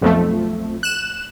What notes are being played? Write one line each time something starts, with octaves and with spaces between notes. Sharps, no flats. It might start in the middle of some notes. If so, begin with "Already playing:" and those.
B1 F2 F3 A3
F#6 E7